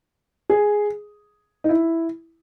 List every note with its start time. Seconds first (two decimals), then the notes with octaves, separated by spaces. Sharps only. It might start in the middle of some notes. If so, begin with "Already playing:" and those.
0.50 G#4
1.64 D#4
1.69 E4